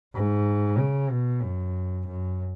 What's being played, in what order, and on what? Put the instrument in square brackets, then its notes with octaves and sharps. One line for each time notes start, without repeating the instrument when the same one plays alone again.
[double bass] G#2
C#3
B2
F#2
F#2